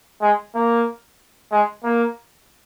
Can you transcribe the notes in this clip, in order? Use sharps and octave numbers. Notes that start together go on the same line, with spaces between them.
G#3
A#3
G#3
A#3